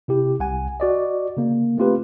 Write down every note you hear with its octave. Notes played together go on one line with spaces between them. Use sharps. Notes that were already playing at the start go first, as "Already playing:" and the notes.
C3 E4 G4
C2 F#5 G#5
F#4 D5 D#5
C#3 A#3
A3 C4 F4 G4 B4